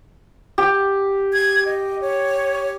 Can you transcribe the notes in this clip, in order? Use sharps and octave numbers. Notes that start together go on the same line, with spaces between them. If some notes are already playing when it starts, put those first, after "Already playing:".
G4
G#6
D#5
C#5